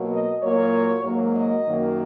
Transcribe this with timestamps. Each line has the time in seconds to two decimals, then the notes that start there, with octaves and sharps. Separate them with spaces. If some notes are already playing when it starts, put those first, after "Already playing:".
Already playing: B2 F#3 A#3
0.11 D#5
0.42 A#2 F#3 A#3 C#5
1.04 G#2 F#3 A#3
1.35 D#5
1.67 F#2 D#3 F#3 A#3